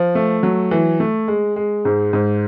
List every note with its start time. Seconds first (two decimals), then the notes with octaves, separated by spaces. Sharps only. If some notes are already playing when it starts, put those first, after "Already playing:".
Already playing: F3
0.15 A3
0.43 F#3
0.71 E3
1.00 A3
1.28 G#3
1.56 G#3
1.85 G#2
2.13 G#2